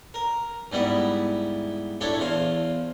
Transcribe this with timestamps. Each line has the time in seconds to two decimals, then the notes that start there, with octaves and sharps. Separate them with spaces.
0.14 A#4
0.72 G#2 G3 B3 E4
2.01 D4 E4 G4 A4 C#5
2.19 E2 C5 F5